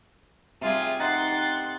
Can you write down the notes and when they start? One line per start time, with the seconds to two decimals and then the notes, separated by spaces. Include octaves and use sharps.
0.61 C3 G3 F4 G4 G#4
1.00 D#4 F#5 C6 A6
1.32 G5